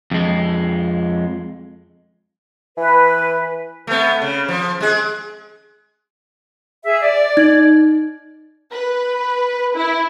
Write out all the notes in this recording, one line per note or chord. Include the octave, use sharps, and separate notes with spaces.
F2 G#3
E3 B4
A3 B3
C#3
F3
G#3 G#4
G#4 E5
D5
D#4 G#6
B4
E4